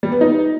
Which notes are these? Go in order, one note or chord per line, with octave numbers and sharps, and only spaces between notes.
G3
B3
D#4